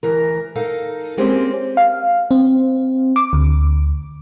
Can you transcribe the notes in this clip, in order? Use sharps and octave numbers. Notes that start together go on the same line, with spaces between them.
D2 E3 A#4
D#4 A4 A#4 F5
G#3 A#3 C4 C#4 G4
F5
C4
D6
D2